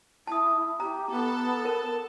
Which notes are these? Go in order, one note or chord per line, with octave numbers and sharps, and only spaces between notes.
E4 A5 D#6
G4 A#5
B3 A4 A5
A#4